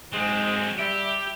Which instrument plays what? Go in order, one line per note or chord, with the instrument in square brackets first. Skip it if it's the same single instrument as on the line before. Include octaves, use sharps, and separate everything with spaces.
[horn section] G#2 G#3 [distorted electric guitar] F#3 C4
[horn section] G3 E5 [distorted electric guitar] G4